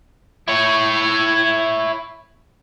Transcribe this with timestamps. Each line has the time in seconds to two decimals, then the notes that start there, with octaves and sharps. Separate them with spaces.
0.48 E4 C#5